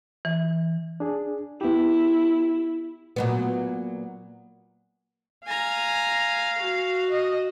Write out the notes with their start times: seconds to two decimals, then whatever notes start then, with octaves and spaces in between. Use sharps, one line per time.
0.25 E3
1.00 D4 G#4
1.61 B3 E4 G4
3.16 A#2 F#3 B3
5.47 F5 G#5 A#5
6.58 F#4
7.11 D#5